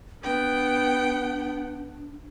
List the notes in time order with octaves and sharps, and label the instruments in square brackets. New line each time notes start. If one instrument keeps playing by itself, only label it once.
[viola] B3 F#5 [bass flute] D4 [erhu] G5